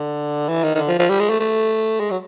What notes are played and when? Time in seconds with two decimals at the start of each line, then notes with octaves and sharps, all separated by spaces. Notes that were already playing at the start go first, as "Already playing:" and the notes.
Already playing: D3
0.48 E3
0.64 D#3
0.75 D#3
0.78 D3
0.88 F3
0.99 F3
1.09 G3
1.20 G#3
1.30 A3
1.40 A3
2.00 G#3
2.11 F#3